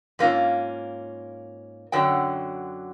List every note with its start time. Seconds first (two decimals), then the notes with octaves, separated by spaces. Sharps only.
0.19 G#2 A#3 C#4 F4
1.92 F#2 D3 F#3 G5